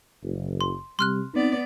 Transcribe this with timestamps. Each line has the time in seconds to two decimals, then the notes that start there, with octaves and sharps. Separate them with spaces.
0.22 F#1
0.61 C6
0.99 C3 G3 C6 F6 F#6
1.34 B3 C4 D#4 D5